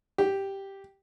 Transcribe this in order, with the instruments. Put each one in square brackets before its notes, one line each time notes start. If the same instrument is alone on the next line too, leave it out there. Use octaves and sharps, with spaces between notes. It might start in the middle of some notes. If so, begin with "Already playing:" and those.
[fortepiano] G4